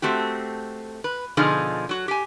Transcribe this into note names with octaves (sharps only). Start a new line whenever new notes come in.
A3 C4 F#4 G4
B4
B2 D3 F3 D#4 F4 G#4
F#3 F#4
G4 G#5